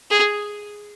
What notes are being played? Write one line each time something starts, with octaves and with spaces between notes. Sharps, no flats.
G#4